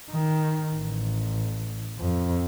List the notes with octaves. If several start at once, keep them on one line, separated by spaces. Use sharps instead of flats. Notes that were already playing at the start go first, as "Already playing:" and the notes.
D#3
A1
F2